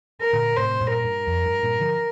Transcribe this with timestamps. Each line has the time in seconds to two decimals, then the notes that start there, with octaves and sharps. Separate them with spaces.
0.21 A#4
0.33 A#2 D3
0.56 A2 C3 C5
0.81 G2 A#2
0.92 A#4
1.04 G2
1.27 F2
1.45 G2
1.63 G2 A#2
1.80 D3 F3